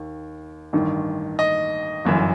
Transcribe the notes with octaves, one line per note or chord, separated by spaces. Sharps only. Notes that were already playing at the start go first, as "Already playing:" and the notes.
Already playing: D#2 D#3
A1 G2 D#3
D#5
G1 F#2 E3